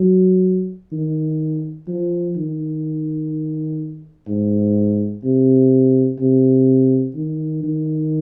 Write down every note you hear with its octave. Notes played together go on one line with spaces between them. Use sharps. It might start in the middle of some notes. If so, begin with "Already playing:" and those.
Already playing: F#3
D#3
F3
D#3
G#2
C3
C3
D#3
D#3